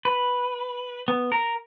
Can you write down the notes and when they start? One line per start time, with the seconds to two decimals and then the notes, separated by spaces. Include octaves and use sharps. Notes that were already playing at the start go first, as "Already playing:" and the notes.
0.05 B4
1.08 B3
1.32 A#4